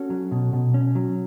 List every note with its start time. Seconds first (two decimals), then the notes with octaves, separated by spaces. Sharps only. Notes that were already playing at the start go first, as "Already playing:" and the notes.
Already playing: C#4 F#4 A4
0.10 F#3
0.32 B2
0.53 B2
0.74 C#4
0.95 F#3